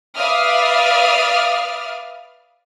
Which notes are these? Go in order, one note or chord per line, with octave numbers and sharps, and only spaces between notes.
B4 D5 E5 F5 D#6 F6